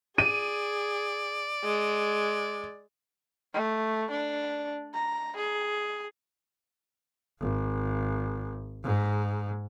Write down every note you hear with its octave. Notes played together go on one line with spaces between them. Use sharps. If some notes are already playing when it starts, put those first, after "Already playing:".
G#4 D5 D#7
G#3
A3
D4
A#5
G#4
G#1
G#2